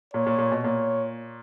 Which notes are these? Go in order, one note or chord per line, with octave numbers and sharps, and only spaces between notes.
A#2 C#5
A#2
A#2
B2
A#2 C#5